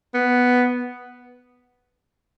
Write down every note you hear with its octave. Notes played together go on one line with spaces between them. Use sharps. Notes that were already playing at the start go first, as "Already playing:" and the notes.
B3